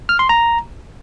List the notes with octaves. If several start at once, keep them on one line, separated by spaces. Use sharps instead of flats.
F6
C6
A#5